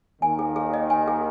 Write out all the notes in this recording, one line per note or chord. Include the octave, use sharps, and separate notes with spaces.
D#2 D#3 G#5
G#4
G#4
D#5
G#5
G#4